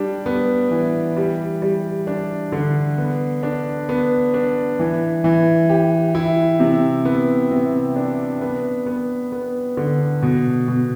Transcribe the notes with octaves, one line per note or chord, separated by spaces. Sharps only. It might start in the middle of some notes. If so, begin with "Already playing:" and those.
Already playing: G3 D4
B3
E3
G3
G3
D4
D3
B3
D4
B3
D4
E3
E3
G4
E4
C3
B3
C3
D4
B3
B3
B3
D3
B2
B2